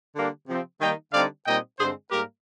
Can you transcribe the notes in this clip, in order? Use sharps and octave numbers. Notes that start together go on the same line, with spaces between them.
D3 G3 A#3 D4
C3 F3 C4
D#3 G3 A#3 D#4 D#5 G5
D3 G3 C4 D#4 D5 F5
A#2 G3 C4 D#4 D#5 G5
G2 D3 G#3 C4 G#4 C5
G#2 G3 A#3 G4 A#4